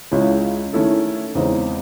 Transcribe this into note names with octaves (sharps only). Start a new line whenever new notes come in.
C#2 C#3 G#3 C#4 E4
D#3 A3 C#4 E4 A4
E2 C#3 G#3 C4 D#4